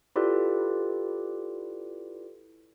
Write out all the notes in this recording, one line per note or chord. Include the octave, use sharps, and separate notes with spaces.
E4 F4 G4 A4 B4 D5